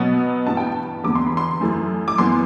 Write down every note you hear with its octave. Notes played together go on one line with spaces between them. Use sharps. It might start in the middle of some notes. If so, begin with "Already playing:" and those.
Already playing: B2 F#3 B3
G2 E3 B3 A5
G5
A5
E2 D3 G3 B3 D6
C6
B5
C6
F#2 E3 A3
D6
F#2 E3 B3 C6